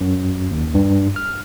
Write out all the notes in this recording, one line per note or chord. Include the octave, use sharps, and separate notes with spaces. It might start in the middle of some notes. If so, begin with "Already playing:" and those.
F#2
D#2
G2
F6